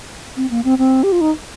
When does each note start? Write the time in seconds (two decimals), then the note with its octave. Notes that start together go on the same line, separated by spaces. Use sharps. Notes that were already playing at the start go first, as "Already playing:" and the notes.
0.37 C4
0.51 A#3
0.64 C4
0.78 C4
1.03 G4
1.12 F4
1.21 D#4